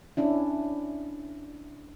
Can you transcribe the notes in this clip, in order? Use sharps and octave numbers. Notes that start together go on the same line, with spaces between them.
C#4 D4 E4